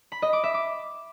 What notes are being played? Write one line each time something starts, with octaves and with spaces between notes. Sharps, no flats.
B5
D#5
D6
E5
D6